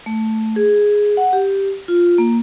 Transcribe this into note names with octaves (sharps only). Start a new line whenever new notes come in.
A3
G#4
F#5
G4
F4
A#3